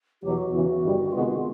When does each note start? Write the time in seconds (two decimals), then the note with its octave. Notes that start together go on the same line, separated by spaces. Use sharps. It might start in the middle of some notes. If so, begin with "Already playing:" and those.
0.23 E2 B2 F#3 G4
0.38 F#4
0.52 E2 C#3 E3
0.82 G1 G2 D#3 G3
1.12 C3 D#3 G#3 B3 F4